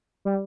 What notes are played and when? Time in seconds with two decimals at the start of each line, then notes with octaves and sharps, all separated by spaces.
0.25 G3